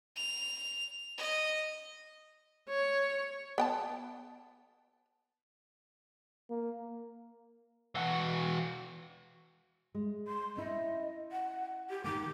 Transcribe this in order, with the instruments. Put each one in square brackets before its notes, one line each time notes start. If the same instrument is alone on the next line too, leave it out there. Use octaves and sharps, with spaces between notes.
[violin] F7
D#5
[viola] C#5
[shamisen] B3 G5 A5
[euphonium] A#3
[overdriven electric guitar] E3 F#4
[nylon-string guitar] G#3
[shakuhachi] C6
[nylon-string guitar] C#4 E4 [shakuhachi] D#5
[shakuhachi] F#5
G4
[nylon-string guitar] D#3 A#3 [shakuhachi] D6